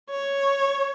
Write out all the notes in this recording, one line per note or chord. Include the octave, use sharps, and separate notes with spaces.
C#5